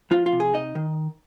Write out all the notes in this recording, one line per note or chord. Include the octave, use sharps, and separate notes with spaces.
F3 F4
F4
C3
G#4
D#4 D#5
D#3